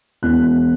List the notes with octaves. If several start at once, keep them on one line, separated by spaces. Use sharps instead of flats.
E1 E2 B2 F#6